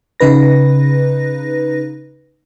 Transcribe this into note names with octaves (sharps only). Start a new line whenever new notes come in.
C#3 D#4 B4 A#6